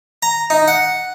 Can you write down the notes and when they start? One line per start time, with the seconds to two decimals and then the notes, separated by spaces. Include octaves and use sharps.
0.23 A#5
0.50 D#4
0.68 F#5